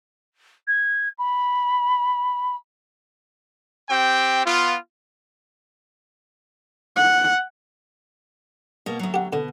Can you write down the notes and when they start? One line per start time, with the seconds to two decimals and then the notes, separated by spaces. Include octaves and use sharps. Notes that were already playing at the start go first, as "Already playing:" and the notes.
0.68 G#6
1.18 B5
3.89 C4 G4 G5
4.46 B3 F4
6.96 F#5
8.86 B2 A#3
8.99 D2 F#3
9.14 G4 F#5
9.33 B2 D3